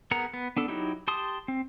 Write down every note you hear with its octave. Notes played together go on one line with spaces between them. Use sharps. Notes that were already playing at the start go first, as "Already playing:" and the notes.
B3 G#4 A#4 F#5 A#5
B3
B3 D4 A4
F#3 D#4 E4 G4
G4 A5 C6 D#6
C4